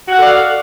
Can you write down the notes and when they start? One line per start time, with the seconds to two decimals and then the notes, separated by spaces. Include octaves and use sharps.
0.08 F#4
0.13 F#5
0.18 A4
0.22 D5
0.27 F5